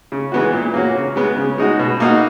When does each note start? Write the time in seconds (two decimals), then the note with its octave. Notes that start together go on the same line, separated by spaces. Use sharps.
0.12 C#3
0.32 E3 G#3 B3 F#4
0.53 A#2
0.74 A#3 C#4 F#4
0.95 C#3
1.16 G#3 B3
1.37 C#3
1.58 G#3 D#4 F#4
1.79 B2
2.00 A#3 D#4 F#4